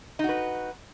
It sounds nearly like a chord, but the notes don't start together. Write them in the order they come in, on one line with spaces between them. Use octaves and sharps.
D#4 F#4 B4